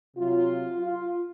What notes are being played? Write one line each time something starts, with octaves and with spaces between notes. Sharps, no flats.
C3 F#3 F4
F4